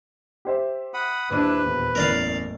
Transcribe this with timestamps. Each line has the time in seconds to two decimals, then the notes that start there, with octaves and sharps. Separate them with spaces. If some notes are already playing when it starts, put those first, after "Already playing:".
0.45 G4 C5 E5
0.94 F#5 B5 D#6
1.30 D#1 D4 E4 B4 D#7
1.64 E2 A#2
1.95 F#1 E2 A2 C#4 A#4 D5 F5